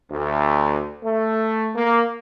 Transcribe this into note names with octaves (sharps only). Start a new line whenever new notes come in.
D2
A3
A#3